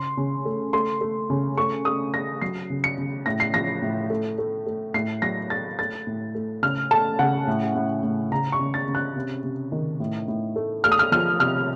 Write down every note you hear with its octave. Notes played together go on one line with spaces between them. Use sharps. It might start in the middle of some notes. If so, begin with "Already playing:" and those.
Already playing: C#3 C6
C#3
A3
A3 C6
A3
C#3
A3 C#6
A3 D#6
A3 A#6
F#3 C7
C#3
C#7
C#3
A2 A#6
C7
F3 A#6
A2
A3
A3
A3
A2 C7
F#3 A#6
A3 A6
A3 A6
A2
A3
C#3 F6
A3 A5
C#3 F#5
A2
A2
A2
C#3 A#5
C#6
C#3
A6
C#3
F#6
C3
C3
D#3
A2
A2
A3
A3 F6
D#6
F6
F3 F6
C3 F6